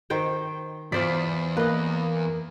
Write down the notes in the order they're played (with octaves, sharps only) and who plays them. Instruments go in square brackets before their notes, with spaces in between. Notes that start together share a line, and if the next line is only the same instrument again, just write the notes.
[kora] D#3 C5 G5
[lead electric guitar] E2 [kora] F4 C5 D5 [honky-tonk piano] B6
[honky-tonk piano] A#3 [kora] B4 D#5